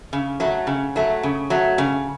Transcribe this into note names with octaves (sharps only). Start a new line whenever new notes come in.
C#3
F#3 A3
C#3
F#3 A3
C#3
F#3 A3
C#3